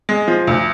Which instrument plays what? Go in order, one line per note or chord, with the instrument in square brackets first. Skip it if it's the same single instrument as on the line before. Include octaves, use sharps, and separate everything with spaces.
[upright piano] G#3
F3
D2